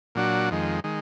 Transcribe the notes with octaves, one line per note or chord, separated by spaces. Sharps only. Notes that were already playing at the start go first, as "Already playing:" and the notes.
A#2 F#3 D4 F#4
F2 D#3 G#3
D#3 G#3